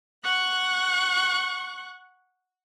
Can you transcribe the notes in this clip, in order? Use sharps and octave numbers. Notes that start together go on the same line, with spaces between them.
F#5 C#6 F#6